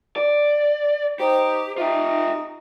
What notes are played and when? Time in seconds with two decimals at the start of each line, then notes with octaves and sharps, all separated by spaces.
0.16 D5
1.20 D#4 G4 C5
1.78 D#4 F4 G4 E5